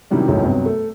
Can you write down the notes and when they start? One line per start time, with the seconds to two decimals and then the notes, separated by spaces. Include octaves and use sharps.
0.11 C3 D#3 E3 F#3 G3 C#4
0.28 G#1 C#2 A2 F#3
0.42 G2 C3 F#3 B3
0.66 A3